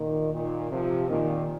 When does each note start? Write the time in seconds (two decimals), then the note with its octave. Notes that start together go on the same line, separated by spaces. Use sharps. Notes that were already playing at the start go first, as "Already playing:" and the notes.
Already playing: A#2 D#3
0.32 A#2 D#3
0.71 C3 F3
1.09 A#2 D#3